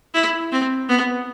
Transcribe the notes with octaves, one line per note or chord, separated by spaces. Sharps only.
E4
C4
B3